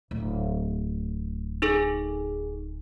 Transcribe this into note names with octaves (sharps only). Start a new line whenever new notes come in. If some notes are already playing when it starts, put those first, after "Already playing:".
D1
D#4 G#4 A4